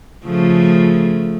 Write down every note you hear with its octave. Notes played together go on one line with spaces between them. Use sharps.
C#3 F3 A3